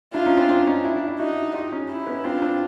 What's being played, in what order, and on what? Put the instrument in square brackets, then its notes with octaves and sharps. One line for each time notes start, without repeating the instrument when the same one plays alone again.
[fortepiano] D4 E4 [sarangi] F4
[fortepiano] C#4 D#4
C4 D4
C4 D4
C#4 D#4
D4 E4
D4 E4
D4 E4
[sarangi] D#4 [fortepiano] E4 F#4
[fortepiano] F4 G4
C#4 D#4
[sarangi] E4
[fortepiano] B3 C#4
[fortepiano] C4 D4 [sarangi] F4
[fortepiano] C4 D4